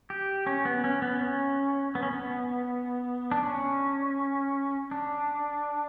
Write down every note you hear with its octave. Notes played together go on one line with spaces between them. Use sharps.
G4
C#4
B3
C#4
B3
C#4
B3
C#4
B3
D4
C#4
D4